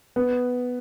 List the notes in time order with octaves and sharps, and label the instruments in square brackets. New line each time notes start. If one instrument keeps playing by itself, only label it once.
[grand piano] B3